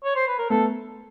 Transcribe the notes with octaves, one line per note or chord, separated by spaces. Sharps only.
C#5
C5
B4
A#4
A3 B3 A4